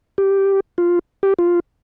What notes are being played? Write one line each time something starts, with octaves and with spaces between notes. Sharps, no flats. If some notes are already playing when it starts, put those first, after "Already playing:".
G4
F4
G4
F4